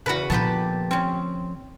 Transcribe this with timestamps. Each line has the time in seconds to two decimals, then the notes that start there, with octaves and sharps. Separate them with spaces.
0.06 E2 C#3 F#4 A#4 B4
0.30 A#2 D3 F3 B3 G4 B4 A5
0.91 C4 C#4